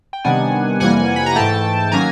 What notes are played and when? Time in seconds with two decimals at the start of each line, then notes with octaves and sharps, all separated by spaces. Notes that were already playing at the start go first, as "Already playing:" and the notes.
0.13 G5
0.24 C3 D#3 G3 B3 D4 F#5 G#5
0.80 F2 C3 E3 G3 A#3 F#5 G#5
1.16 B5
1.26 A#5
1.36 G#2 E3 A3 G5 A5
1.92 D#3 F#3 A#3 C#4 G#5 A#5